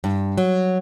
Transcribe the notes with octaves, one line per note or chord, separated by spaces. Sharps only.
G2
F#3